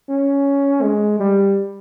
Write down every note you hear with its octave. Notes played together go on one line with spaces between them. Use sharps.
C#4
G#3
G3